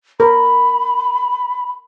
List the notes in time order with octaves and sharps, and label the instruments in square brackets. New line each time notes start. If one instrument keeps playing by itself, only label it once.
[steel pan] A#4 [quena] B5